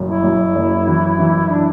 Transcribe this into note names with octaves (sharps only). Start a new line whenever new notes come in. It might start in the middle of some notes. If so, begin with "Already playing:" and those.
Already playing: F#1 F#2
E4
F#2
F#1
E3
E3
D4